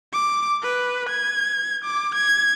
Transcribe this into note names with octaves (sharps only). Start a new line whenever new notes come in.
D6
B4
G#6
D6
G#6